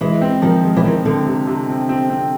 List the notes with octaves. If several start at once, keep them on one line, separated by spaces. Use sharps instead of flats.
E3 G#3
C4
D#3 F3
G#3
E3
D#3 C4
D3 C4
C3
C3
C4
C4
C4